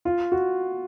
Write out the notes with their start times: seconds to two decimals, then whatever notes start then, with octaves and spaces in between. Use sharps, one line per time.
0.05 F4
0.32 F#4